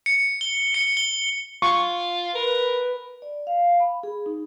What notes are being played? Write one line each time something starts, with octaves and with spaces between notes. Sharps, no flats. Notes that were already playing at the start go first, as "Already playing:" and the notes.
C#7
G7
C#7
G7
F4 C#6
A#4 B4
D5
F5
B5
G#4
D#4